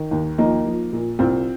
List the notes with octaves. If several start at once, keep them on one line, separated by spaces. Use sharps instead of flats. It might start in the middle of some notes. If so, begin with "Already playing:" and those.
Already playing: D#3
D#2
F3 A#3 D#4
F3
A#2
C2 C4 F4